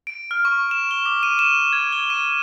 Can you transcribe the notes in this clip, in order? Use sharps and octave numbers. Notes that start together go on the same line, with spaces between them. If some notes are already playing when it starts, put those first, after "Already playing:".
D7
F6
C#6
E7
G7
D6
D#7
E7
G#6
G7
D#7